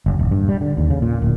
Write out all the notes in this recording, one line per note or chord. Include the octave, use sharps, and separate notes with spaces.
F#1
D#1
G2
G3
D3
D#2
C#3
A#2
D1